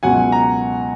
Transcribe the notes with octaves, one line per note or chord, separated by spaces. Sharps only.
C#2 B2 F#3 F#5 G#5
A#5